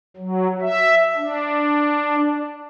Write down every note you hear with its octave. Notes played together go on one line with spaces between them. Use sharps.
F#3
E5
D4